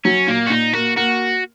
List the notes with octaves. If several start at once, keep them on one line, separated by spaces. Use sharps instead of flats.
F#3 C#4
A#2 A#3
F#4
A#2 D#4
A#3 F#4
A#3 F#4